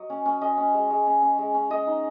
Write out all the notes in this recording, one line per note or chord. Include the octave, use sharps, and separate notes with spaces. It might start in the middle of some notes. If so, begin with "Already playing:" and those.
Already playing: F#3 D#5
C#4
C#4
C#4 D#5
C#4
G#3
G#3
C#4
C#4
G#3
C#4
G#3 D#5
D#4